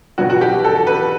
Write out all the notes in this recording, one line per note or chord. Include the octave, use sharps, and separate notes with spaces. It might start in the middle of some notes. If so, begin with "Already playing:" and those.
B2 F#3 B3 F#4
F#4
G4
A4
B4